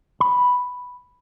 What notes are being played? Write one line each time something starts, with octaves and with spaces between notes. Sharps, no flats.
B5